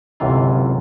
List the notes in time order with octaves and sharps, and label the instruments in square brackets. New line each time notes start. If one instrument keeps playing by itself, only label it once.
[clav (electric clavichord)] G1 C#2 F#2 C3 E3 F4